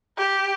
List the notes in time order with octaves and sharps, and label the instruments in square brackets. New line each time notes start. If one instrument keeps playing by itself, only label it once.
[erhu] G4